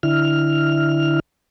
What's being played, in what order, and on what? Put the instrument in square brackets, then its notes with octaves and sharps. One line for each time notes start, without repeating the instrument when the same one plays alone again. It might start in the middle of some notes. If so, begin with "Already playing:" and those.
[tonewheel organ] D3 E4 F6